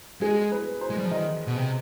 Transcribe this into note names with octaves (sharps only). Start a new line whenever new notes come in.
G#3 G#4
B4
C5
G#3
G3
F3
D#3 D#5
B2
C3